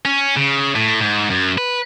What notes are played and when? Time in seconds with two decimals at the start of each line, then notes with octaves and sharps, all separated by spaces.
0.05 C#4
0.37 C#3
0.75 A2
1.01 G#2
1.30 F#2
1.58 B4